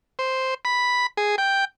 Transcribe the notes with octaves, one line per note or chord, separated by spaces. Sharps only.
C5
B5
G#4
G5